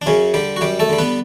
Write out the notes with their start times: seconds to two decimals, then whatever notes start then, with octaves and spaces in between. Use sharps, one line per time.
0.02 D4
0.06 F#2 C#3 C#4
0.34 D3 G3 G4
0.56 F#4
0.61 F#2 G3 G4
0.79 A3 A4
0.89 D3 G3
0.98 B3 B4